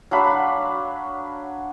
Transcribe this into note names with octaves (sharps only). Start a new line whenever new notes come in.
F#3 D4 F5 B5